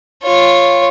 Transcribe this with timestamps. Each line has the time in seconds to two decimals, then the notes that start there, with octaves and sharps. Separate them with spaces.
0.23 F4 C#5